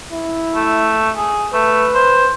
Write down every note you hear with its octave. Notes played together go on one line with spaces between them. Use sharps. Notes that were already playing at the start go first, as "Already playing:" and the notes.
E4
A3
G#4
A3 B4
C5